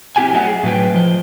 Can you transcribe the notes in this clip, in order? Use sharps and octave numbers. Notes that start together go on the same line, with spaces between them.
C4 E4 G4 G5 G#5
F#3 A3 D#5 E5 F#5
G#4
A2 F#3 B4 G5
F3 D#5